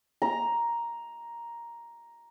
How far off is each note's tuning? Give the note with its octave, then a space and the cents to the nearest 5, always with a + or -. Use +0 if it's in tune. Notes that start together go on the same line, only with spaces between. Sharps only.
A#5 +5